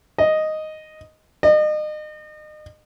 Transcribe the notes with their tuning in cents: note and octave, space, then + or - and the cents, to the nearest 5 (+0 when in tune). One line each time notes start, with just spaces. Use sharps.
D#5 +0
D#5 -35